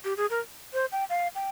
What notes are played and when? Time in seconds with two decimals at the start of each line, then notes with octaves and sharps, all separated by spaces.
0.04 G4
0.17 G#4
0.30 A#4
0.74 C5
0.92 G5
1.10 F5
1.35 G5